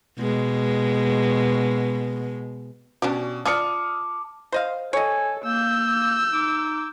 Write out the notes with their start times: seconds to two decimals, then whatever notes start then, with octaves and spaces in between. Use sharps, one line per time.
0.19 B2 G#3
3.02 B2 C#4 D4 G4
3.46 F4 D5 A5 D6 D#6 F6 C#7
4.52 C5 D#5 F5
4.93 A4 C#5 D#5 G#5
5.44 A#3 E6 G6
6.32 D#4 D6